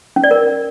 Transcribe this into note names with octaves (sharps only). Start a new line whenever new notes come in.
C#4
D5
A#4